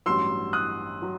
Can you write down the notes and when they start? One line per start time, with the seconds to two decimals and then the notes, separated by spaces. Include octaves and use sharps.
0.06 A1 G2 F#3 C6 E6
0.53 D#6 F#6
1.02 F#3